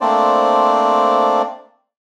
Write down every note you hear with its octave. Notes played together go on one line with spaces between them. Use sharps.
A3 A#3 C4 D4 C5 D5